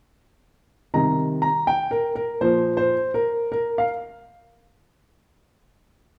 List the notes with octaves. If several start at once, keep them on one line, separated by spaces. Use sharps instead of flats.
C3 D#3 G3 A#5
A#5
G5
A#4
A#4
A#2 F3 C5
C5
A#4
A#4
F5